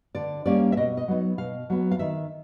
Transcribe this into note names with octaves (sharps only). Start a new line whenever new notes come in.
D3 D5
G3 A#3 C#4 D5
E5
B2 D#5
D#5
F#3 B3 D#4
B2 F5
F#3 B3
F5
D#3 E5